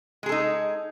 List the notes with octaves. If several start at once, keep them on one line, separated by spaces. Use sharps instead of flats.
G#3 D#4 G#4 A4